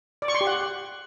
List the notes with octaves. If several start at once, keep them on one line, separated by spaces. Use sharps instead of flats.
D5
C#6
C6
G4
F#5